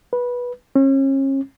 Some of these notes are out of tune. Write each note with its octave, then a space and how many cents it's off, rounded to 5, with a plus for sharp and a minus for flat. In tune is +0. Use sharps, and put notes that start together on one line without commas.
B4 -15
C#4 -35